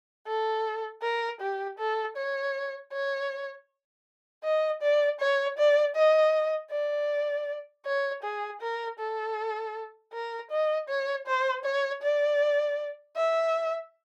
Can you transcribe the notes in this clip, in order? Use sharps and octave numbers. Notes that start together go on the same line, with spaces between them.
A4
A#4
G4
A4
C#5
C#5
D#5
D5
C#5
D5
D#5
D5
C#5
G#4
A#4
A4
A#4
D#5
C#5
C5
C#5
D5
E5